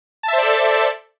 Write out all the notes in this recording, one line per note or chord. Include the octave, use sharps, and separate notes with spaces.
A4 C5 D5 E5 A5